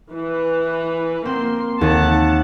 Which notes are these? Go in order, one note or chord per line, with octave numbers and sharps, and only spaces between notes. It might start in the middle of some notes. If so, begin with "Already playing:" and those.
E3 B4
A#3 C4 C6
D#2 F#5 A5